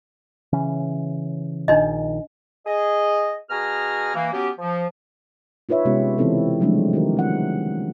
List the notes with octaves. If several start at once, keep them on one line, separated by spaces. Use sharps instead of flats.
C#3 E3 C#4
A#1 D#3 D4 D#4 D#5
G#4 D#5
B2 F#4 G#4 G#5 A#5 F6
E3 A#3
F#3 B3 C#4 G4
F3
D#4 F4 B4 C#5 E5
C3 G#3 B3 C#4 F4 G4
C#3 E3 B3 C4 E4 A4
F3 F#3 G#3 A3 C4 D4
D#3 F4 G4 A#4 C5
C4 F#5